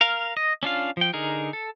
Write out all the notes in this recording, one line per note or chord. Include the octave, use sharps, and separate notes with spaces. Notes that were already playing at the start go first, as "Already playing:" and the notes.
A#4 F5
D#5
C#4 D4 F4 F5
F3 G5
D3 D#4 G#4 A#4
A4